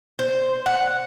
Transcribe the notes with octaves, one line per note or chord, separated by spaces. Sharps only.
C5
F#5